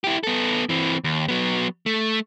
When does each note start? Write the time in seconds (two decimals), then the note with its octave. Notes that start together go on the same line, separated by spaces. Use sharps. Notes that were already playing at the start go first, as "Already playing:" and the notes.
0.04 E4 G4
0.23 B3 A4
0.69 E3 C4
1.04 D#2
1.28 F#3 B3
1.86 A3